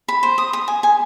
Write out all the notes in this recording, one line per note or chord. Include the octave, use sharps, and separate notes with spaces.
B5
C5
D#6
D#6
G#5
G#5